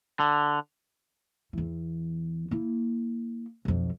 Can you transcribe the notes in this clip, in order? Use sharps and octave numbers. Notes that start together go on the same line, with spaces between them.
D3
E2 E3
A#3 E4
B1 F2